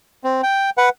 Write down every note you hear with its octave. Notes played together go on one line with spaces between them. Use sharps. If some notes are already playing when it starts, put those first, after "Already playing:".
C4
G5
B4 F#5